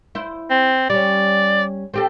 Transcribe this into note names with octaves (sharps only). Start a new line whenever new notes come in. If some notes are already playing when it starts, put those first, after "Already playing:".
E4 C5
C4
G3 C#4 D5
C4 G4 A4